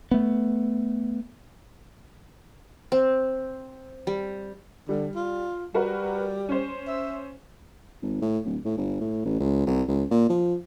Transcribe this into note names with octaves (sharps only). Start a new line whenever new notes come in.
A3 B3
C4
G3
D3 G3
F4
G3 F#4 A#4 B4
C#4 C5
E5
G#1
A2
D1
A2
G1
A2
A1
C#2
C2
C#2
A#2
F3